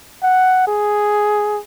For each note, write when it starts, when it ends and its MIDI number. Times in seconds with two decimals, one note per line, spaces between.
0.23 0.66 78
0.67 1.60 68